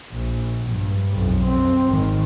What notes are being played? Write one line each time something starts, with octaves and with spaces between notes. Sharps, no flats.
A#1
G2
B1 F2
C4
G#1 D#3